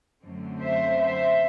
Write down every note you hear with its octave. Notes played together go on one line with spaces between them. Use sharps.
F#2 D3 F#3 A3 C4
C5 E5
C5 E5